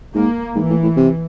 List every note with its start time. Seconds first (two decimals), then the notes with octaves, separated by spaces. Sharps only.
0.14 G#2 A#3
0.55 G#2 E3
0.70 A2
0.83 A2
0.96 C3